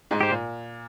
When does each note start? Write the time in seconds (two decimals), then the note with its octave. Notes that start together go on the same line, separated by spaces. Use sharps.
0.11 G#2 G#3
0.21 G4 C5
0.30 A#2